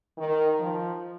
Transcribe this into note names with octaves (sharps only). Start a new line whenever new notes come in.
D#3
F3